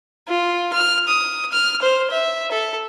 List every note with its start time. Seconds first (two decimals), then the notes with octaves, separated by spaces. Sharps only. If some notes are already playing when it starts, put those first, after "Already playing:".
0.28 F4
0.73 F6
1.08 D#6
1.52 F6
1.82 C5
2.11 E5
2.51 A4